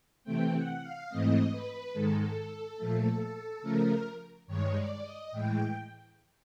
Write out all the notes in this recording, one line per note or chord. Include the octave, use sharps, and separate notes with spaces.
C3 E3 A3 C4 G5
F#5
F5
G#2 E3 A3 C4 D#5
B4
G#2 D#3 G#3 A4
A#2 F3 A3
C#3 F3 A3 A#4
G2 D#3 G#3 C#5
D5
D#5
A2 E3 G#3 G5